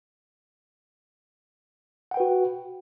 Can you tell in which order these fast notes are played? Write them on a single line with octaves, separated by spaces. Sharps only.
F#5 G5 B4 F#4